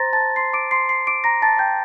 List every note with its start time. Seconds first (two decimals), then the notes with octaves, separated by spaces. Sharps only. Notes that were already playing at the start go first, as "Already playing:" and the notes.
Already playing: C5 A#5 C6 A6 A#6
0.13 A5 A6
0.36 C6 C7
0.53 D6 D7
0.71 C6 C7
0.89 C6 C7
1.07 D6 D7
1.24 A#5 A#6
1.42 A5 A6
1.59 G5 G6